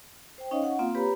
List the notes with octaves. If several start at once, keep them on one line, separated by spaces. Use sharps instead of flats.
C5 G5
C#4 D#4 C#5 D#5 F5 C#6
F#5
A#3 C4 F4 F5
G4 B4 C#5 A#5 B5